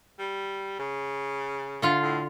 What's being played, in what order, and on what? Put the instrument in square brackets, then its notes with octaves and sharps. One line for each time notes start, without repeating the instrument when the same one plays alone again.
[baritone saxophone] G3
C#3
[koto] D3 F4 F5
[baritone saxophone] A2